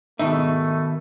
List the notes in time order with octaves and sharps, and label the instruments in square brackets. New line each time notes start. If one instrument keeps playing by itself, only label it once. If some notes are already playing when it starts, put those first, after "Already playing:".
[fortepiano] G#2 [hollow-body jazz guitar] B2 D#3 D#4 [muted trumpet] A3 [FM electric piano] E5